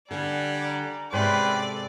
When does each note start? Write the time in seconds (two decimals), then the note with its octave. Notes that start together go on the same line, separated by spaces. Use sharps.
0.11 D3 G3 D5 F#5 G#5
0.63 A#5
1.13 G#2 C3 C#4 B4 D5 G5 C6
1.47 A4